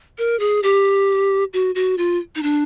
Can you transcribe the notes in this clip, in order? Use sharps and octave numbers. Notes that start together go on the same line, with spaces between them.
A#4
G#4
G4
F#4
F#4
F4
D#4
D4